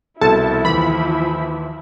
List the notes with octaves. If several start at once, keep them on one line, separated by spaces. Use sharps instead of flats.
C2 B2 F3 E4 A4 A5
D#2 E3 B5